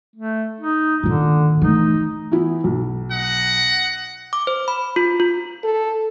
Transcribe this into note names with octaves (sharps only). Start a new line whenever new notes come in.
A3
D#4
A#2 D3 D#3
E3 A3 D#4
E3 B3 E4
B1
D#5 F#5
D6
C5
B5
F4
F4
A4